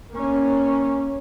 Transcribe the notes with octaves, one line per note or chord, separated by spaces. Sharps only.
A#3 C#4